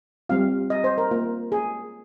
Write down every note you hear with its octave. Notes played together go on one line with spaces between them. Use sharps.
G3 C4 F4 F5
D#5
C5
A#4
A#3 F4
G#4